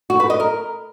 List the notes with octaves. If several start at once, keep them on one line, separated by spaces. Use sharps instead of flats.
F#4
B4
D#5
A#4